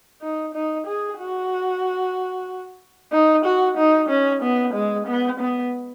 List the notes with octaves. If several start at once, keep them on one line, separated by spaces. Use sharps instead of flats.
D#4
D#4
G#4
F#4
D#4
F#4
D#4
C#4
B3
G#3
B3
B3